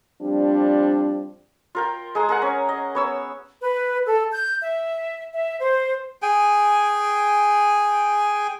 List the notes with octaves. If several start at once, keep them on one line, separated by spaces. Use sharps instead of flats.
F3 G3 C4 D4
F4 A#4 G5
G#3 G#4 A#5
G#4 A#4 F#5
C#4
D#5
B3 C#5 E6
B4
A4
G6
E5
E5
C5
G#4 G5 G#5